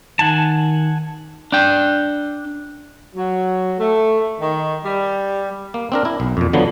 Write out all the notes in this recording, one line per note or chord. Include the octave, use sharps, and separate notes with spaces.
D#3 F#5 G#5 A5
D4 G5
F#3
A3
D#3
G3
A#3
C4 D4 A#4
E4
B1
F2 A#2
D3 F3 F#3 B3